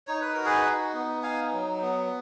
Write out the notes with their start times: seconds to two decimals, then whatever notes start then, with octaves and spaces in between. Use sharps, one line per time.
0.07 D#4 C#5
0.21 B4
0.33 F#4 A#4
0.45 G#4 B4
0.65 D#4
0.94 B3
1.23 D#4 F5 G#5
1.53 F#3
1.81 B3